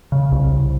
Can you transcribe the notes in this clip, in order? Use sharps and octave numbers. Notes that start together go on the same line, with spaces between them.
C#3
C2
C2